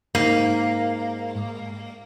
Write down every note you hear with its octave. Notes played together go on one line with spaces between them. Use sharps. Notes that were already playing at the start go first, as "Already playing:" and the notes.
G#2 A#3